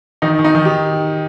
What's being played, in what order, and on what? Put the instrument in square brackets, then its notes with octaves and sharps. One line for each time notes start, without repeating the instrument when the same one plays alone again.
[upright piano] D#3 D#4
D#3
D#4
D#3
G4